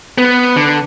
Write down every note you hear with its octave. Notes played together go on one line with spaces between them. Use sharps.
B3
D3